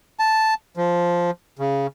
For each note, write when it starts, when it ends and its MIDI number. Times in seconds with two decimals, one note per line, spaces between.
0.19 0.54 81
0.77 1.31 53
1.59 1.87 49